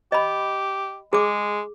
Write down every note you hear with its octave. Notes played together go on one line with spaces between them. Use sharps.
G4 D#5 B5
G#3 G#4 D6